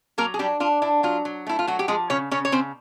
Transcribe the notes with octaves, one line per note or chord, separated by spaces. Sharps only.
F#3 A#3 A#4
G#4
G3 D4 G4
D4 F4
D4 E4
F#3 F4
F#3
A3 E4
F4
F#3 F#4
G4
F3 G#3 G#4
C#3 C#4 C#5
C#3 C#4 C#5
C#5
C#3 C4 C5